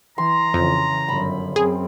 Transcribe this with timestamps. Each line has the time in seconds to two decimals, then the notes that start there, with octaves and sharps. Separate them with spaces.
0.18 E3 A#5 C6
0.54 F2 C#3 E3
1.08 G1 F#2 B5
1.56 F#2 C4 G#4